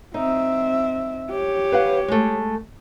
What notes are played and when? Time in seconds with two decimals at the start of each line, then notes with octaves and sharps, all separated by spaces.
0.14 C4 D#4 E5
1.30 G4 C#5
1.72 B4 F5 F#5
2.08 G#3 A3